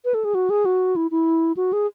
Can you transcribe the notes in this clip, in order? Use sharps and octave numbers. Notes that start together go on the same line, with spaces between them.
B4
A4
G#4
F#4
G#4
F#4
E4
E4
F#4
G#4